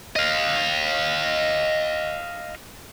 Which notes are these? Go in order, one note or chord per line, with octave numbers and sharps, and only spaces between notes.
D#5 F5